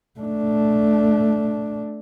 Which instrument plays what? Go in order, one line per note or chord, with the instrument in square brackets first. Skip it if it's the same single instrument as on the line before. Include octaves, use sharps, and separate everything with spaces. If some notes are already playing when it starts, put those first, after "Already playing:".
[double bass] A3 D4